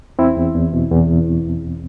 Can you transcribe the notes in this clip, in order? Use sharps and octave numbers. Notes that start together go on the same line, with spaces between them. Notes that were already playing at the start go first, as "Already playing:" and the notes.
E2 C4 E4
E2
E2
B2
E2